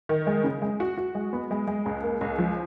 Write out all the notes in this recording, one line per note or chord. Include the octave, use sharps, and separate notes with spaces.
D#3
G#3
C#3
G#3
F#4
F#4
G#3
B3
G#3
G#3
C#2
A#3
C#2
F3